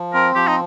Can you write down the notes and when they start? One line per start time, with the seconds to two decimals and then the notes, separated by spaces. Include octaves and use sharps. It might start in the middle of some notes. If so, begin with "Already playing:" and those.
Already playing: F3
0.14 C4 A#4
0.35 F3 G4
0.48 D#4